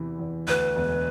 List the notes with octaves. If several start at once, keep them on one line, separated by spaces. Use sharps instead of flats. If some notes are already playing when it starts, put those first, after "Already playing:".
Already playing: E2 C3 E3
E2
D2 B4
E1